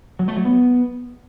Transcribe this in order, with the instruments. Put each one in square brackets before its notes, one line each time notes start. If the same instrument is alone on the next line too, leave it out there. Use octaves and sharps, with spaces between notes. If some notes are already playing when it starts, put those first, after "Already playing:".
[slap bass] F#3
A3
F#3
B3